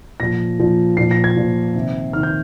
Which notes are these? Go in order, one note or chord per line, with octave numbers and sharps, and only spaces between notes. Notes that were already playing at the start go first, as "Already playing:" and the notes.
A#2 F3 A#6
A#2 F3
A#2 F3 C7
A#6
G#6
A#2 F3
C3 D#3
C3 D#3 F6
G6